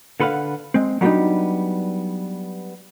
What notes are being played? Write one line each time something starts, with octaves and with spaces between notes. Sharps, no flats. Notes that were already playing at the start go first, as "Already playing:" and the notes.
D3 A4 B4 C5 F5 F#5
G#3 C4
F#3 G3 A#3 B3 D4 D#4